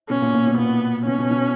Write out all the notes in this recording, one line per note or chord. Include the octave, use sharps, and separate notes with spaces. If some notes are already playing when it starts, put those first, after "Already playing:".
B2 C#4
A#2
A#2
B2
A#2 B3
B2 C#4
B2
B2